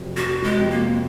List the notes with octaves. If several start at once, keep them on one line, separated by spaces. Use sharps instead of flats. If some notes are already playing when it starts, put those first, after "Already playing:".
Already playing: F1 F2 C3 F#3
F1 F#4
G#3
F2 C3 F#3
A#3